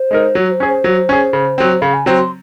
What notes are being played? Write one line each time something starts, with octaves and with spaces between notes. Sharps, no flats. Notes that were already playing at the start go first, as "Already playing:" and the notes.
Already playing: C5
G#3 D#4 A#4
F#3 C#5
C5
C#4 G#4
C5
F#3
C#4 G#4
C#3
F#3 C4
C#3 F5
G#5
F#3 C4 A#5
C6